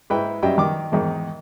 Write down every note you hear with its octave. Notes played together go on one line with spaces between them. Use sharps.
G#2 E4 B4 G5
F#2 G3 D#5 E5 G5
D#3 D6
E2 G#2 D#3